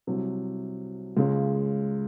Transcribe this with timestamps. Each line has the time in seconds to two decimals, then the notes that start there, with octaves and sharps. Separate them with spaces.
0.07 C2 C3 F#3
1.17 C#2 C#3 G#3